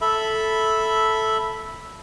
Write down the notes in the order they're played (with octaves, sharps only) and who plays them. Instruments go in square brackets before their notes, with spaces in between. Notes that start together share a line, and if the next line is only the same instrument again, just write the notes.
[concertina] A4 E5 B5